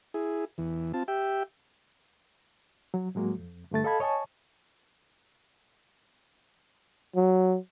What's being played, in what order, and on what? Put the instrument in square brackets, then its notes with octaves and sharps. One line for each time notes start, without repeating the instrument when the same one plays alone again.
[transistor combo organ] E4 G#4
E2 E3
C4 F4 A5
G4 E5 G5
[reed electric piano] F#3
A2 F#3 G#3 A#3 F#4
F2
G2 D3 A3 A6
A4 D#5 F5 A5 B5 G#6
C#5 D#5 G#5 A5 C#6
[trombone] F#3